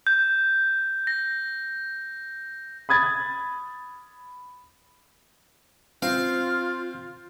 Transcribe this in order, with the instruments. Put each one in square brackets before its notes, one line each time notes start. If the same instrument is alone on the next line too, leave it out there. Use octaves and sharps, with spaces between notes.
[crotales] G6
A#6
[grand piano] B5 D#6 G#6 A6
[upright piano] C4 [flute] F4 [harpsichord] F5